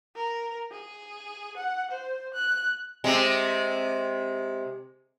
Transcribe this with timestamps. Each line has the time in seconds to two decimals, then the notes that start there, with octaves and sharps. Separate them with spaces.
0.16 A#4
0.71 G#4
1.57 F#5
1.91 C5
2.34 F#6
3.04 C3 G#3